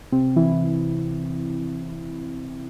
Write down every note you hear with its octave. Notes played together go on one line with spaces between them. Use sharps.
C3 C4
E3 E4